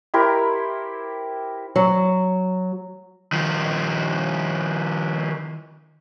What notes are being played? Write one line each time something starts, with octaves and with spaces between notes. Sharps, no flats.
E4 G4 A#4 C5
F#3
D#3 F3